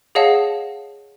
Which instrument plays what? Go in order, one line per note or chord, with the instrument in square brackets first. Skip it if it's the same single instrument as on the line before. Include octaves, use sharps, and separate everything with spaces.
[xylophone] G#4 C#5 D#5 F5 F#5 A5